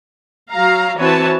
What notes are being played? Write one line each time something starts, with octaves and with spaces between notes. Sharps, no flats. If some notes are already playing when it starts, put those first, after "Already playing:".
F#3 F5 A#5
E3 C4 F#4 B4 C#5 A5